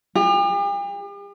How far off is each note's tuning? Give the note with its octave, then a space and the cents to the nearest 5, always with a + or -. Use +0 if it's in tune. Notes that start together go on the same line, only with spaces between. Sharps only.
G4 +45